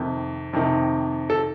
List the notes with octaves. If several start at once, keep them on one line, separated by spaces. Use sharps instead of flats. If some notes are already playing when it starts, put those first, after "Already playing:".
Already playing: F2 C3 D#3
F2 C3 D#3
A4